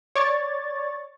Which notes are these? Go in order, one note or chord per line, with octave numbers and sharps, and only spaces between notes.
C#5 D5 C#6 A6